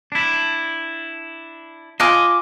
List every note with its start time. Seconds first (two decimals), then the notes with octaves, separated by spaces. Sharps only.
0.12 D4 E4
2.00 F4 D#5 G#5 D6